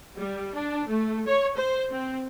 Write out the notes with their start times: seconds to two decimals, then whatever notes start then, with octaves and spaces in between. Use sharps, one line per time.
0.16 G3
0.55 D4
0.87 A3
1.26 C#5
1.56 C5
1.91 C4